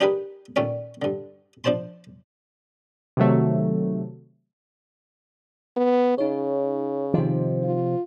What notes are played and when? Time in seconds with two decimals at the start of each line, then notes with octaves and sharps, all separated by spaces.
0.01 D4 D#4 G4 G#4 A#4 B4
0.56 A#2 D#3 A3 C#4 D5
1.02 G2 D3
1.64 F3 D4 C5 A5 C6
3.17 C3 D#3 F#3 A3
5.77 B3
6.18 C#3 D#4 C#5
7.14 C3 D#3 F3 D#4 C5
7.64 F4